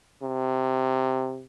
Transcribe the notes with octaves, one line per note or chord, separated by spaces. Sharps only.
C3